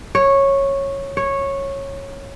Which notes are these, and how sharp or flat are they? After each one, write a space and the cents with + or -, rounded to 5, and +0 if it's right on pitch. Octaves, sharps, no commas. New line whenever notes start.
C#5 -10
C#5 -10